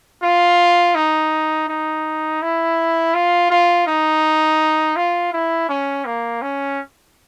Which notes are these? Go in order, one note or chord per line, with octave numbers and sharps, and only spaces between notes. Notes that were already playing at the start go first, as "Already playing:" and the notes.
F4
D#4
D#4
E4
F4
F4
D#4
F4
E4
C#4
A#3
C#4